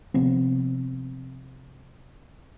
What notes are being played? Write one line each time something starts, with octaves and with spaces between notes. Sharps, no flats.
C3 F3 B3 C4